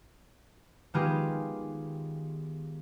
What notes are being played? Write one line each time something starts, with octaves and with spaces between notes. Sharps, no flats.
D#3 G#3 B3 F4 G4 G#4